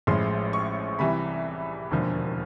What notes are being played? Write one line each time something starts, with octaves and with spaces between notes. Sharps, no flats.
A1 A2 F3 G#3 C6
C#6
C2 C3 E3 G3 B5
E1 D#2 D3 F3